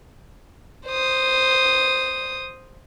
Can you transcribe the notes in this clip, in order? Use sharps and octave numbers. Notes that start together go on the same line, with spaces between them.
C5 D#6